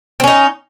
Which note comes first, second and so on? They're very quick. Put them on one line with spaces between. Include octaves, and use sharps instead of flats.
C4 C#4 D#4